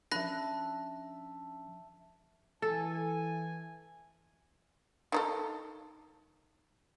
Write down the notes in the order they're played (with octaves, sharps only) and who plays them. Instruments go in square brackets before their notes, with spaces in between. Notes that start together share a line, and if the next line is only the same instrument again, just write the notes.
[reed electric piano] F3 C#4 D4 [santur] E5 A5 [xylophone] B5 F#6 A#6
[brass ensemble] E3 G#5 [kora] A4
[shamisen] D#3 D#4 A4